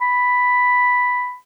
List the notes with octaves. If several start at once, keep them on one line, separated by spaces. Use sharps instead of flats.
B5